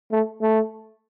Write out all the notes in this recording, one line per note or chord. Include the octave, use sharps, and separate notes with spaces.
A3
A3